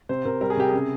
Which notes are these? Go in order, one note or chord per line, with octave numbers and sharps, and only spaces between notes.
C3 C5
C3 A#4
G3 A#4
G#4
C3 G4
C#3 G#4